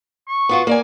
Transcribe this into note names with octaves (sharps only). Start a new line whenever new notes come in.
C#6
B3 F4 F#4
A#3 D5 G#5